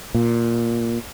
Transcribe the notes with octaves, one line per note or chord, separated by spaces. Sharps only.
A#2